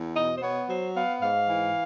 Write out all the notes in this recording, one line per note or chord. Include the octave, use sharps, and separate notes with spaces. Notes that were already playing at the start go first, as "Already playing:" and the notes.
Already playing: E2
B2 D#5
C5
B3 C#5
F#3 C5
B3 F5
G#2 F5
E3